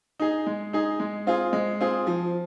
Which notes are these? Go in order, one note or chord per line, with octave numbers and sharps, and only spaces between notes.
D#4 G#4
G#3
D#4 G#4
G#3
C4 F4 G#4
G#3
C4 F4 G#4
F3